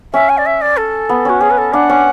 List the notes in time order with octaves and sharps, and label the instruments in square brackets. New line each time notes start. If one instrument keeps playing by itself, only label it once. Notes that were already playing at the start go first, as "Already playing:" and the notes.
[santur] C#4 [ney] E5
[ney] G#5
D5
E5
D5
A4
[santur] B3
[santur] C#4 [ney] F#4
[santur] C#4 [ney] G#4
[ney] B4
A4
[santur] D4 [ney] F#5
[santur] C#4